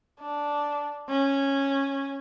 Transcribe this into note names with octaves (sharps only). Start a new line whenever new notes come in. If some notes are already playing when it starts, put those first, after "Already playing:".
D4
C#4